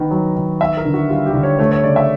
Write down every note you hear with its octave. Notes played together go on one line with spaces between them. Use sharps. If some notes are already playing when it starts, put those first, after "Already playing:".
Already playing: D#3 B3
F#3
D#3
B3 E5
A#4
D3
F#4
G3 F4
G4
D3
C#5
A3 C#5
C#5
C#3 D5
E5